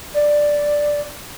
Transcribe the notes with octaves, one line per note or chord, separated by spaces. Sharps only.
D5